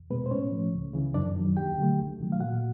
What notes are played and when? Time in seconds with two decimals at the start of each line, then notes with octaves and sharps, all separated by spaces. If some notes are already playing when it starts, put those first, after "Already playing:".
Already playing: E2
0.10 B2 G#3 B3 B4
0.26 C5
0.31 A2 C#4 C#5
0.52 F3 A3
0.73 C#2
0.93 C#3 E3
1.14 F#2 D4 D5
1.36 D#3 F#3
1.57 D#2 G4 G5
1.78 D3 F#3 A3
1.98 C2
2.20 C3 D#3 F#3 A3
2.32 F5
2.40 A#2 F#4 F#5